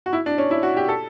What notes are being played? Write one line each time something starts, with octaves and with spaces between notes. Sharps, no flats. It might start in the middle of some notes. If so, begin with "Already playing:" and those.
F#4
E4
D4
C#4
E4
F#4
G4
A4